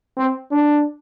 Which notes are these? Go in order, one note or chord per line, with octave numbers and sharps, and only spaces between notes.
C4
D4